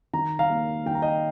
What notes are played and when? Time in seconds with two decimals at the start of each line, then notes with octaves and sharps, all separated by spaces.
0.13 D#3 A#5
0.39 F5 A#5
0.50 A#3
0.86 D#3 G5
0.94 A#5
1.02 D#5 G5